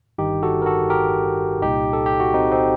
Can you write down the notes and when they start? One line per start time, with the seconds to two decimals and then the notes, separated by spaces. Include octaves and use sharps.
0.18 G1 G2 D#3 D#4 G4
0.43 F#4 A4
0.62 A#4
0.66 F#4 A4
0.90 G4 A#4
1.62 C2 A#2 D#4 G4
1.93 A4
2.06 G4
2.20 F#4
2.34 C4 D#4
2.52 C4 D#4